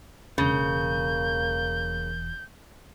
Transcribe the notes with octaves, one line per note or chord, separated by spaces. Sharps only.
E1 E2 C#3 A#3 G6